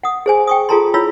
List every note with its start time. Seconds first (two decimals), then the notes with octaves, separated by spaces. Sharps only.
0.04 F#5 D#6
0.26 G#4 C5 G#5
0.47 G5 C#6 D#6
0.69 F4 G#4 A4 A5 A#5 C6
0.94 E4 F4 C#5 B5 E6